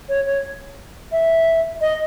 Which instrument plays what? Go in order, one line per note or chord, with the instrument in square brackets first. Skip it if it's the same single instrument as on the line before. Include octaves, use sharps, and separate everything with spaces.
[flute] C#5
C#5
E5
D#5